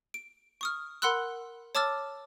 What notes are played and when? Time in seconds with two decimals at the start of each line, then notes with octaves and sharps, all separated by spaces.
0.14 D7
0.61 C#6 D#6 F6
1.02 A#4 F#5 B5 C6 E6 F#6
1.75 C#5 A5 D6 E6 F6 A6